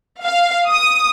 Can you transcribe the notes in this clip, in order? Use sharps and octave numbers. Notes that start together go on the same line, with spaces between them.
F5
D#6